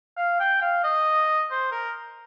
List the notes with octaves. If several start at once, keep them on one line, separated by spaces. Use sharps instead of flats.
F5
G5
F5
D#5
C5
A#4